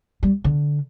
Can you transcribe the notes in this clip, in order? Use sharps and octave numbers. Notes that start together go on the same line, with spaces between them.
G3
D3